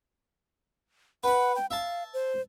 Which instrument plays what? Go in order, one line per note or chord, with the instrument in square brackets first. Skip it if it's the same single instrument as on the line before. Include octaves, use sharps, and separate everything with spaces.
[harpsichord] B4 B5 [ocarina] F#5
[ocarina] G5
[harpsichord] E5 A5 [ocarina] F5
[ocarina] C5